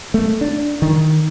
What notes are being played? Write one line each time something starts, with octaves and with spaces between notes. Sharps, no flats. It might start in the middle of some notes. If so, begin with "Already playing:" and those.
A3
D4
D#3